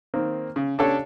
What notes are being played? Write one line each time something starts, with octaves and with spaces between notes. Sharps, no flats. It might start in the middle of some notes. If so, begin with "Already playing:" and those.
D#3 A#3 C4
C#3
C#3 D4 G4 A4 C#5